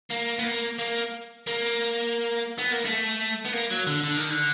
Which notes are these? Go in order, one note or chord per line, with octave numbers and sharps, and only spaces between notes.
A#3
B3
A#3
A#3
A#3
B3
A#3
A3
B3
A#3
F#3
D3
D3
D#3
D3